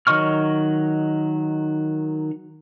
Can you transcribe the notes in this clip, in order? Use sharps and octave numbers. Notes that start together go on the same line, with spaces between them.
D#3 F#3 D#5 C#6 F6